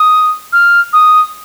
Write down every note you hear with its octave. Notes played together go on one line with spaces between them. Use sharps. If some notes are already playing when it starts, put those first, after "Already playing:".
Already playing: D#6
F6
D#6